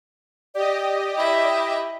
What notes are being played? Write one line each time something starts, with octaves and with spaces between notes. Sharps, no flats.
G4 D5 D#5
E4 E5